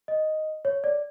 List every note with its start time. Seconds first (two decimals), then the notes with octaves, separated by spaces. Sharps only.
0.08 D#5
0.65 C#5
0.84 D5